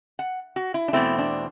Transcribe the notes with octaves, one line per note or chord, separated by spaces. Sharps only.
F#5
F#4
E4
D4
E2 B2 A3 C4 E4
D4